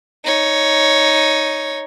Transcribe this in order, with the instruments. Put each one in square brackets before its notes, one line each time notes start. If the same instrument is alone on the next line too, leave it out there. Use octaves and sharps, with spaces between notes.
[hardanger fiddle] D#4 C#5